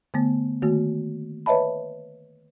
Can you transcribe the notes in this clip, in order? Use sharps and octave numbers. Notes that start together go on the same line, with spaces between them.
D3 A3 B3
D#3 A3 A#3 F#4
B4 C#5 D#5 E5 A5 B5